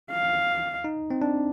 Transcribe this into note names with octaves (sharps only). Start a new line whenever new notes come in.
F5
D#4
C4
D4